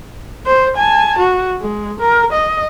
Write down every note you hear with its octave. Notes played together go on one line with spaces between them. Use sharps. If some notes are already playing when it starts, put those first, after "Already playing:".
C5
G#5 A5
F#4
G#3
A#4
D#5